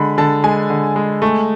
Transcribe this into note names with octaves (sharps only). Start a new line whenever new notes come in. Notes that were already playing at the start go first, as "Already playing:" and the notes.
Already playing: D3 G#3 B5
D3 A5
G#3 G#5
D3
G#3
A3